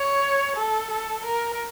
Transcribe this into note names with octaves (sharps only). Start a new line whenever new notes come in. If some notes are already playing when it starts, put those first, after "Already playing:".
Already playing: C#5
A4
A4
A#4